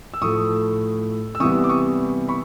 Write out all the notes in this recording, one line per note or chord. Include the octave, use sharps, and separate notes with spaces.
E6
A2 F3 A3 C#6 D#6
E6
C3 E3 G3 B3 E4 C#6 D#6
D6
C#6 D#6
B5 C#6